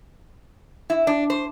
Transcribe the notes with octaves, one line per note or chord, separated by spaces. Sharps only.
E4
D4
C5